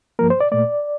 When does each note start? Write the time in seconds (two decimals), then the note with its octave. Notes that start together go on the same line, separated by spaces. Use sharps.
0.19 G2 F3 A#3 A#4
0.30 C5
0.40 D5
0.52 A#2 A3 D5